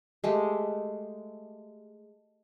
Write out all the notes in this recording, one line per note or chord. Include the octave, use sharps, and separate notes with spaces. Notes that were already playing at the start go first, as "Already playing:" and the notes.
G#3 A3 G4